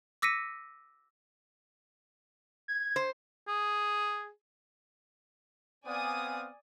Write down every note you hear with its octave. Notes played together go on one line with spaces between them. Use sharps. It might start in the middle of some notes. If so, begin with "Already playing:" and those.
D6 E6 A#6 B6 C#7 D#7
G#6
C5
G#4
B3 C4 D5 F5 G#5 D#6